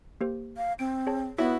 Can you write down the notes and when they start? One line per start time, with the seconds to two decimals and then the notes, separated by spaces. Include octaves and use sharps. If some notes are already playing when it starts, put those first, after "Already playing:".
0.21 A#3 G4 C5
0.57 F5
0.79 C4 D7
1.07 G#4 C#5 A5
1.38 B3 E4 F#4 C#5 E5 B5